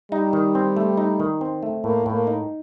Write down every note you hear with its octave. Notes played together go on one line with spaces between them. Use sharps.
G3 D#4
D#3
C4
A3
D#4
D#3
C4
A3
A2 A#3
A2
A#3
D#4